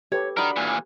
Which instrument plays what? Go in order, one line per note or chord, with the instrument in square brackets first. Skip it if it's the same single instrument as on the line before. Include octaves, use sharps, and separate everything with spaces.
[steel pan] G4 A4 B4 [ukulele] C#5
[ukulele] D4 F#4 B5 [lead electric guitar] D#4 A#4
[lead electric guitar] A#2 E3